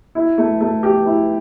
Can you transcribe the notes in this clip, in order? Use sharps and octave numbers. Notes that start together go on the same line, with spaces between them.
E4
A3
A3
G4
E4